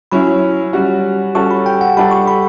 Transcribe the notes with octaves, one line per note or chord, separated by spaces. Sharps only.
F#3 C#4 E4 B5
G3 C#4 F#4
G3 C#4 F#4 A4 C#6
B5
G5
F#5
G3 D4 A4 B5
C#6
B5